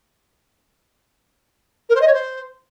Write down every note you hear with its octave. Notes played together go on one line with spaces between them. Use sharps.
A#4
C5
D#5
C#5
C5